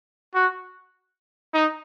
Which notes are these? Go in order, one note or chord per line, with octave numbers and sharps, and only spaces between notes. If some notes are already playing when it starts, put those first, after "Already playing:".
F#4
D#4